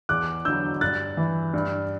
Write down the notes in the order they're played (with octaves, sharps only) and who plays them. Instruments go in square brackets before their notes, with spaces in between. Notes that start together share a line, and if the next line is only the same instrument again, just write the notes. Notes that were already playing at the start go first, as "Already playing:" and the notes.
[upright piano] E2 D6 F#6
D3 F#3 E6 G6
G2 F#6 A6
E3
G2